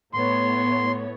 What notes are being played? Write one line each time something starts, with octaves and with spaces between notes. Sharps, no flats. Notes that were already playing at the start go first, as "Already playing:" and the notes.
A2 B3 C#5 C6